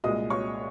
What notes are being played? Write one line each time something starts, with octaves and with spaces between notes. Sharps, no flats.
C2 A#2 G#3 D#5 D#6
C#5 C#6